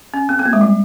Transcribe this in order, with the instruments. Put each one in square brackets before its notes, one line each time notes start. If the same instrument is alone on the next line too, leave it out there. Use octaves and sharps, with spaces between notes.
[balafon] C#4
C4
C4
A#3
G#3
G3